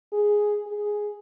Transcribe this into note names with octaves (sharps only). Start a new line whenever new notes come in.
G#4
G#4